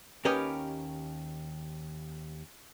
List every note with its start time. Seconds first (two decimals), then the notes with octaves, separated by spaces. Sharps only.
0.25 D#2 C#4 G4 A#4 B4 D#5